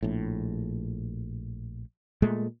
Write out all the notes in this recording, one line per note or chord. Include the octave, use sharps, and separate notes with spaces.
A#1 A2
A#2 G#3 A3